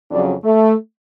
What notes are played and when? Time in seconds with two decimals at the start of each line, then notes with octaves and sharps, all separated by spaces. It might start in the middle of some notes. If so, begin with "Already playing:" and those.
0.10 F2 C#3 F#3 D4
0.43 A3